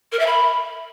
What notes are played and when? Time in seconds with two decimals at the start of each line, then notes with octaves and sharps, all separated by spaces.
0.12 A#4
0.19 E5
0.26 B5